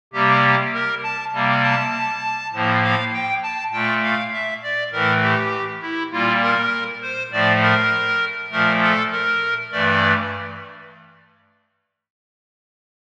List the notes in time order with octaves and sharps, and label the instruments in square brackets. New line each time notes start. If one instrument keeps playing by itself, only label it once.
[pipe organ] C3 G3 A#3 G4
A#4
A5
C3 G3 A#3
A5
A2 F3 A#3
F5
G5
A5
A#2 A3 G5
F5
E5
D5
A2 E3 A3 A#4
G4
E4
A#2 G3 A#3 F4
A#4
C5
A2 F3 A3 D5
A#4
A#2 F3 A3 A#4
A4
A#4
G2 E3 A3 D5